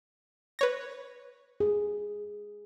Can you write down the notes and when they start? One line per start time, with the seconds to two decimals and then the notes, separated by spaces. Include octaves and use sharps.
0.59 B4 C#5 A#6
1.60 G#4